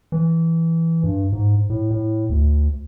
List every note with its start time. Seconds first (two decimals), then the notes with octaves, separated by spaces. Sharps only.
0.12 E3
1.04 G2
1.33 G#2
1.70 A2
1.91 A2
2.30 D2